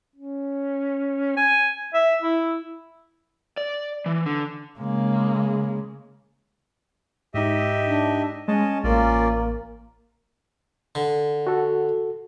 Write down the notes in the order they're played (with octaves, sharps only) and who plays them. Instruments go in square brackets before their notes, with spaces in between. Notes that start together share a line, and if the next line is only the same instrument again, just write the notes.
[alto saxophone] C#4
G#5
E5
E4
[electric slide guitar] D5
E3
D3
[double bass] C#3 [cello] G#3 [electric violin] A#3
[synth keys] G#2 D#4 [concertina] G4 D#5 E5
[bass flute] D4
[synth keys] G#3 [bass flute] C#4 [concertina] C#5 D#5 A5
[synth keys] A1 [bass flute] A#3 [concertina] C#4 F4 D5
[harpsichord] D3
[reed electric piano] F#4 A4